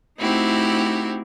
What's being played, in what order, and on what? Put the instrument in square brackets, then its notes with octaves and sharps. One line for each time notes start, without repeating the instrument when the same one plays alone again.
[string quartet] A3 C4 D#4 E4 F#4 G4